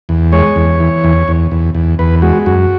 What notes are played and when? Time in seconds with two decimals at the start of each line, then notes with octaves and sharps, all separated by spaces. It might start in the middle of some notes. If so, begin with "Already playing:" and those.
0.09 E2
0.32 G#3 C#5
0.56 E2
0.80 E3
1.04 E2
1.28 E2
1.51 E2
1.75 E2
1.99 E2 B4
2.22 G#3 F#4
2.46 F#2 F#4